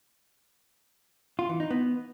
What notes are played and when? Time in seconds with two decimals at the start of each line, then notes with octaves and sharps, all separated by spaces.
1.39 F4
1.49 E3
1.60 D#4
1.70 B3